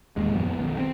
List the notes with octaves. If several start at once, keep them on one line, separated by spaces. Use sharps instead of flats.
E1 D#2 A#2 G#3
A#1 F#2 F3 B3
F2 B3
B1 D#3
C4